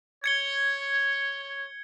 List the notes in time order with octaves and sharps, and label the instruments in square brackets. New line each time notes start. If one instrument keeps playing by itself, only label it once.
[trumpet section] C#5 [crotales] G#6 C#7 G7